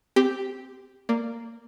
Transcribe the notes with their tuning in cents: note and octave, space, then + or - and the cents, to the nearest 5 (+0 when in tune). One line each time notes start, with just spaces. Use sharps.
C4 -15 G4 +0
A#3 -10 D5 +0